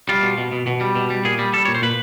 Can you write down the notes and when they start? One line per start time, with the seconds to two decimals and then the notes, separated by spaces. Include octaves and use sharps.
0.09 G3 F4
0.23 B2
0.38 B2
0.52 B2
0.67 B2
0.81 G3
0.95 B2
1.10 G3
1.25 A#2 G#4
1.39 G3
1.53 G3 A4
1.65 A#2 C#5
1.75 C5
1.82 A#2 B4